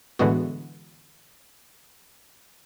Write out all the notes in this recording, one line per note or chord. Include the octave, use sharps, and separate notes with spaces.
A2 D3 E3 G#3 B3 F#4